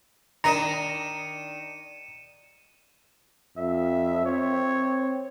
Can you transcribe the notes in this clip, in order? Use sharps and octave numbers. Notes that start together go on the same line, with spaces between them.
D#3 D4 D#5 A#5 C#7 D#7 E7
F2 E5
C4 C#5